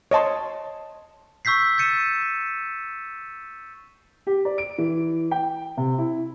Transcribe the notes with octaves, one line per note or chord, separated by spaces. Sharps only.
C#5 D#5 A5 C6
C#6 E6 G6 B6 C7
G6 A6 C#7 D#7 E7
G4
D5
D7
E3
G5
C3
E4